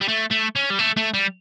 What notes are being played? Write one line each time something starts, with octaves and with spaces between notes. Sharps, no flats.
G3
A3
A3
C#4
G3
A3
A3
G3